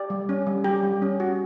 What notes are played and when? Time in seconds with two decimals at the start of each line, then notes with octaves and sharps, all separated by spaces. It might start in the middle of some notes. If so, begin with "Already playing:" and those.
Already playing: G4 D5
0.10 G3
0.29 C#4
0.47 G3
0.64 G4
0.83 G3
1.02 C#4
1.20 F#4